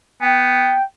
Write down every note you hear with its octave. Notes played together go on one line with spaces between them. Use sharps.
B3 G5